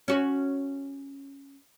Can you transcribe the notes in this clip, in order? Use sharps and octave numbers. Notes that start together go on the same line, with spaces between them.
C#4 F#4